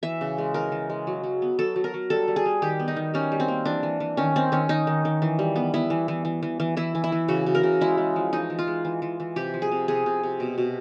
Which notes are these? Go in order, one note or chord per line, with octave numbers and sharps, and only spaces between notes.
E3 E5
C#3
G#3
E3 A#4
E3
G#3
F#3
F#3
B3
F#3 A4
F#3
A#4
F#3
G3 A4
G3
G#4
G3
D#3 G4
B3
D#4
D#3
G3 C#4
G3
C4
A#3
E3 D4
E3
E3
D#3 C#4
D#3 C4
D#3 C#4
D#3 D#4
D#3
D#3
E3
G3
B3
B3 E4
E3
E3
E3
E3
E3
E3 E4
E3
E4
E3
C#3 F#4
C#3
A#4
C#3
G#3 E4
G#3
F3
E3 D#4
E3
F4
G#3
E3
E3
E3
C3 G4
F3
G#4
C3
C3 G#4
C3
C3
B2
B2